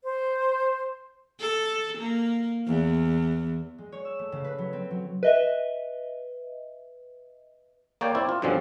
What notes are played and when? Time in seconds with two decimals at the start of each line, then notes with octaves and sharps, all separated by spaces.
0.04 C5
1.40 A4
1.98 A#3
2.67 E2
3.78 G#3
3.92 C#5
4.05 E6
4.19 A3
4.32 C#3
4.44 B4
4.58 F#3
4.73 C4
4.90 F#3
5.23 B4 D#5 E5
8.01 A#3 C#5 D5 G5
8.15 C4 E4 D5
8.29 F4
8.42 G2 B2 D3 F3 C4 C#4